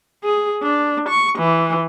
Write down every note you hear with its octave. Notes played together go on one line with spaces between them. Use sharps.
G#4
D4
C#6
E3